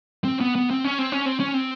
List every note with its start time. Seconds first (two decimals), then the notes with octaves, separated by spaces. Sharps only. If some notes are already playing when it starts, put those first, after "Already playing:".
0.24 C4
0.41 B3
0.55 B3
0.71 C4
0.84 C#4
0.98 C4
1.12 C#4
1.26 C4
1.40 C#4
1.54 C4